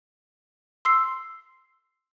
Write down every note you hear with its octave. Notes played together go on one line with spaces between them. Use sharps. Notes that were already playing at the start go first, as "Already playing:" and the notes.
C6 E6 C7